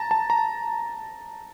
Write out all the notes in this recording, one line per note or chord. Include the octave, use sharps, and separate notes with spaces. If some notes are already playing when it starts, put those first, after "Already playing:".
Already playing: A5 A#5
A5
A#5